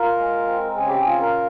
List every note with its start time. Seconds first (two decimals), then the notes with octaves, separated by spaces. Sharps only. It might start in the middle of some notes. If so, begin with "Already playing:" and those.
Already playing: F4 A#4
0.16 G#3
0.47 C4
0.77 C#3 G#4
0.88 G4
1.01 G#4
1.07 F4
1.21 A#4